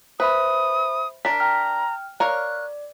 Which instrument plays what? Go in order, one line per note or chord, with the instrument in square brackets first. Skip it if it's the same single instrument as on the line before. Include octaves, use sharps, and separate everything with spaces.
[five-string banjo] B4 [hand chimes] C5 E5 B5 [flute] D#6
[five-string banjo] D4 A#4 [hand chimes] B6
[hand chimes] G5 F6 [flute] A#5
[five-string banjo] A#4 C#5 F5 [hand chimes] D5 [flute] F#6